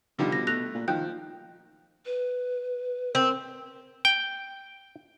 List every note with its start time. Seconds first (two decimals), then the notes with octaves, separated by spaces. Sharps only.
0.19 D3 D#3 F3 G3
0.32 B2 A#6
0.47 A3 F#6 A#6 F7
0.74 A#2
0.88 D#3 F3 G5 F#6 G6
2.06 B4
3.15 C4 A#4
4.05 G5